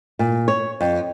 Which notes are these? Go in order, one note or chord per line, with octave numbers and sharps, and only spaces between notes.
A#2
C#5
F2